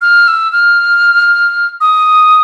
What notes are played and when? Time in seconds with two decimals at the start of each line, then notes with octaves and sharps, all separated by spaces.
0.01 F6
0.28 E6
0.53 F6
1.81 D#6